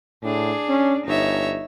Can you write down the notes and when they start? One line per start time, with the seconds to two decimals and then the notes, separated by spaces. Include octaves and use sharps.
0.23 A2 D4 G#4
0.69 C#4
1.07 G1 D#4 C#5 E5